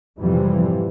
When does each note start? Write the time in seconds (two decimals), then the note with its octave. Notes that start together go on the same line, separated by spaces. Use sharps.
0.19 F2 G#2 C3 E3 F3 G3